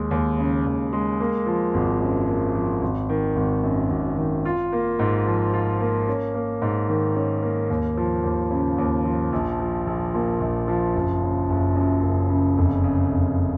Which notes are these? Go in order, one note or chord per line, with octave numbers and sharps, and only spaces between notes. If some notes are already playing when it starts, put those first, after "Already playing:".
Already playing: D#2 G#3
D#2
C#3
D#2
G#3
A#3
F3
G#1
F#2
A#3
F3
G#1
D#3
G#1
F#2
G#1
D#3
F4
A#3
G#2
F3
F4
A#3
C#4
A#3
G#2
D#3
C#4
A#3
D#2
F3
D#2
C#3
D#2
F3
A#1
F3
A#1
A#2
A#1
F3
F#1
C#3
F#1
F#2
F#1
C#3
F1
C#3
F1